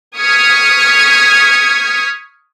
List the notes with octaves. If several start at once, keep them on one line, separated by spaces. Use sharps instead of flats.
C#6 D#6 F6 G#6 B6 C#7